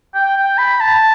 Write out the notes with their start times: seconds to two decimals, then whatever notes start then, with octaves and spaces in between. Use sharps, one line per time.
0.15 G5
0.37 G5
0.58 B5
0.80 A5